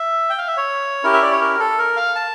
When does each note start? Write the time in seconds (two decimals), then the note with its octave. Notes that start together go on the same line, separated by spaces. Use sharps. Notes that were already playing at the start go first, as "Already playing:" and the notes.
Already playing: E5
0.30 G5
0.38 F5
0.48 E5
0.57 C#5
1.03 C#4 E4 G4 A#4
1.13 E5
1.22 D5
1.31 C#5
1.41 A#4
1.60 A4
1.78 A#4
1.97 F5
2.15 A5